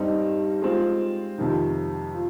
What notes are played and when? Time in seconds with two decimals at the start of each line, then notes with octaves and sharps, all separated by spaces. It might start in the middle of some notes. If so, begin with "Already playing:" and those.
Already playing: G2 G3 C4 D#4
0.62 G#3 C4 F4
1.38 F2 C3 D#3
2.14 F4